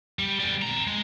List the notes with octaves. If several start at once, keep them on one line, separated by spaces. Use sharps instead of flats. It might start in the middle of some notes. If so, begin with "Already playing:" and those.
G3
G3 B3
C4 A#5
G#3